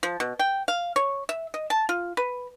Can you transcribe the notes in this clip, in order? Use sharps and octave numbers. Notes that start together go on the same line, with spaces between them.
F3
B2
G5
F5
C#5
E5
D#5
A5
F4
B4